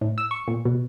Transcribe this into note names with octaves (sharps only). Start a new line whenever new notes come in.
A2
E6
C#6
A#2
B2